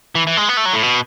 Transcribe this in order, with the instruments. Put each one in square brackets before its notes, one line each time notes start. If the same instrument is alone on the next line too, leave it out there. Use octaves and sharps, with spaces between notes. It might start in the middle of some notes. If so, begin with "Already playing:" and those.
[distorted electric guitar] E3
E3
G#3
B3
A3
F#3
A2
B2